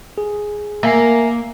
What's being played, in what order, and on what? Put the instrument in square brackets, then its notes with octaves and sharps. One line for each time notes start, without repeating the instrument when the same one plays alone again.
[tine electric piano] G#4
[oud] A#3 [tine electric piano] E5 G#5 C7